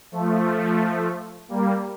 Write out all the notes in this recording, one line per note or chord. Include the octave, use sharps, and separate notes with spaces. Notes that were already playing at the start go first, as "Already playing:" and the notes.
F3 A3
G3 A#3